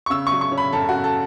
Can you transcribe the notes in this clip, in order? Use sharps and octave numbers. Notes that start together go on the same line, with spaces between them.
C#6
C#3 E6
C#6
F#3
C#6
C#4
B5
F#2 A4
F#4
C#3
A4